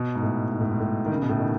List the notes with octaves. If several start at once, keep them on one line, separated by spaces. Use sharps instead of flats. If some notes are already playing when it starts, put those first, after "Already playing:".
Already playing: B2
G#2
A2
G#2
A2
G#2
A2
D#3
C#3
B2
A2
D#3